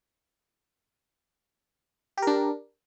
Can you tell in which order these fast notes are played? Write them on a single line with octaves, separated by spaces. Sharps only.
G4 A#4 D4